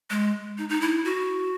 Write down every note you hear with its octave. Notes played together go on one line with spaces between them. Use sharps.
G#3
D#4
D#4
E4
F#4